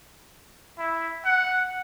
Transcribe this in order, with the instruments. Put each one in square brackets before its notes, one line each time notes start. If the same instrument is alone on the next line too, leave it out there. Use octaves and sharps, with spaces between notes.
[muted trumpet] E4
F#5